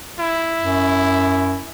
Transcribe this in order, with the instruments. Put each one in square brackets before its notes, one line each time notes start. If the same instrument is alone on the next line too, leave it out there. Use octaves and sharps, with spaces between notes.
[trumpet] E4
[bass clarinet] F#2